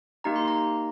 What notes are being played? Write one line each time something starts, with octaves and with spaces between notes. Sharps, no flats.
A#3 D#4 G4 A#5
C6
A#5